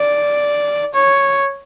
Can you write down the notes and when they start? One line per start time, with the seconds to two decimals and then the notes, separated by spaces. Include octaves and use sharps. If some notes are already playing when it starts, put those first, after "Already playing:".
Already playing: D5
0.94 C#5